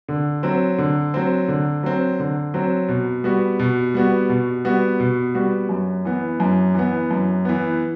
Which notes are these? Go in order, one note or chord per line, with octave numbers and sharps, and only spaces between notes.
D3
F#3 C4
D3
F#3 C4
D3
F#3 C4
D3
F#3 C4
B2
G3 B3 F#4
B2
G3 B3 F#4
B2
G3 B3 F#4
B2
G3 B3 F#4
F#2
E3 B3
F#2
E3 B3
F#2
E3 B3